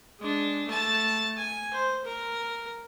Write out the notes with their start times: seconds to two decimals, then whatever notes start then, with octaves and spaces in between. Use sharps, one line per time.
0.19 G#3 D4
0.66 A3 A5
1.37 G#5
1.73 C5
2.04 A#4